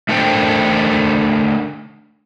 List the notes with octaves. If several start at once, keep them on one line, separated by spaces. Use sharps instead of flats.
A3 D4 A4 A#4 C5 G5